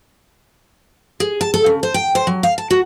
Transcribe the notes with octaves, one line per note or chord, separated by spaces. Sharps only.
G#4
A5
A4
C#3
C5
G5
C5
F#3
F5
A5
F#4